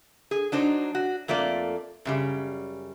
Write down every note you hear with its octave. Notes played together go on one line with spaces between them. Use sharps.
G#4
F#3 D4 D#4 C5
F#4
F2 A3 A#3 F4 D5
F#2 C#3 G3